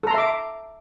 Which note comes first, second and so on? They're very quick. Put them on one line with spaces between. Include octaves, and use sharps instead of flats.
A4 A#5 C6 E5 D6